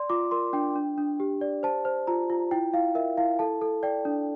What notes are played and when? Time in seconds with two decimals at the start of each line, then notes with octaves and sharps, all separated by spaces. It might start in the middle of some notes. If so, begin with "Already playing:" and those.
Already playing: D5 C6
0.10 F4 D6
0.31 A#4 C6
0.53 D4 G5
0.75 D4
0.98 D4
1.20 G4
1.41 D5
1.63 C5 A5
1.85 C5
2.07 F4 A#5
2.30 F4
2.51 E4 G5
2.73 E4 F5
2.95 A#4 E5
3.17 E4 F5
3.39 A4 A5
3.61 A4
3.83 D5 G5
4.05 D4